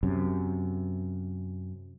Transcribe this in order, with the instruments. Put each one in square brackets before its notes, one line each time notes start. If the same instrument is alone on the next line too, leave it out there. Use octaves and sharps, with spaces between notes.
[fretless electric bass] F#2 C3